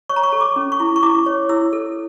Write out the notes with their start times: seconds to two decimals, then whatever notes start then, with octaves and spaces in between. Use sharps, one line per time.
0.09 C#5 C#6
0.16 A#5
0.23 C#6
0.33 A4
0.41 D6
0.56 C#4
0.72 C#6
0.80 E4
0.96 C#6
1.03 E4 D6
1.26 C#5
1.49 E4 E6
1.73 A4